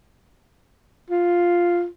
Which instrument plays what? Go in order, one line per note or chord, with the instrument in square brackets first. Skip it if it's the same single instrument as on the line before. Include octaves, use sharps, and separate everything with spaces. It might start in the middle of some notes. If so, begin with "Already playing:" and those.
[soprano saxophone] F4